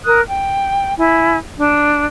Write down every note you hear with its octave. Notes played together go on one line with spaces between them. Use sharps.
A#4 D#6 F#6
G5
E4 G#5
D4